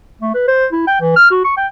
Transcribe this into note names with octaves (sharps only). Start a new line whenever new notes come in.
A3
B4
C5
E4
G5
E3
F6
F#4
C#6
G5